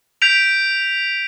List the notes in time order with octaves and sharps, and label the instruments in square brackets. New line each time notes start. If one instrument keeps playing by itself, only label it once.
[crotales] G6 B6 D7 F7